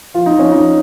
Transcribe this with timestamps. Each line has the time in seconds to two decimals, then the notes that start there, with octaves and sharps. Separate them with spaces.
0.14 F3 F4
0.26 D#4
0.33 F3
0.39 C#4
0.52 F3 D#4